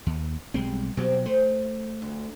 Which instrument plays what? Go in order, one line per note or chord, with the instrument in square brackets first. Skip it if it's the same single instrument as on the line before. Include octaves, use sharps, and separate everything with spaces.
[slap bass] D#2
[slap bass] B1 G#3 C4 [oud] G3
[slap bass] B2 F#3 [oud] C4 F#4 G4
[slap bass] A3 [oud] C5
[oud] D2